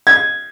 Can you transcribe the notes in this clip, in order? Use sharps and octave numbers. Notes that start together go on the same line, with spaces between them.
G#6